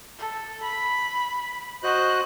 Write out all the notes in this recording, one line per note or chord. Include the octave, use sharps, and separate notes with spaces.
A4
B5
F#4 C5 D#5 F#6